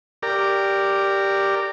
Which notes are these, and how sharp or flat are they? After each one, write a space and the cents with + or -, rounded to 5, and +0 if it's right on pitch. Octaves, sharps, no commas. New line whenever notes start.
G4 +0 A#4 -15 D5 +0